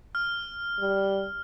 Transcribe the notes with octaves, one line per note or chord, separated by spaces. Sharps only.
F6
G3